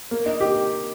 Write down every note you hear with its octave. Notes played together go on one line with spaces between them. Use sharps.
A#3
D#4
G4